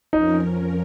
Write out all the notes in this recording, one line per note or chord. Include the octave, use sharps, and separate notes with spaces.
F2 F3 C#4 D#4 A#4